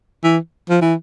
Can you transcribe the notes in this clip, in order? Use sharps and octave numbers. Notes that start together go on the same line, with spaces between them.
E3
F3
E3